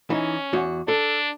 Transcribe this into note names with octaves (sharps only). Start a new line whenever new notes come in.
E3 C#4 D#4
E2 F#4
D4 A4